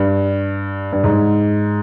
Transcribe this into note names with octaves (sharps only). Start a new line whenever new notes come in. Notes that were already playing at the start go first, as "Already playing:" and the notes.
Already playing: G2
G2
G#2